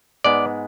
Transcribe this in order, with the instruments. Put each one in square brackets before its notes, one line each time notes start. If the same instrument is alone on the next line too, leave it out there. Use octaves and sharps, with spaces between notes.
[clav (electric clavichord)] G#2 G#3 B3 D5